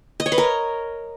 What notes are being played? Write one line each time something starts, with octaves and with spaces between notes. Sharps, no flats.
D#5
C#5
B4
A#4